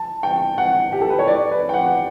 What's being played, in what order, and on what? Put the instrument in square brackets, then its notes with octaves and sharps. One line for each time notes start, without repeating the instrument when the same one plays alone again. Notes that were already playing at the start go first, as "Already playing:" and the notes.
Already playing: [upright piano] A5
G5
F#5
G4
A4
B4
C#5
D5
B4
G5
F#5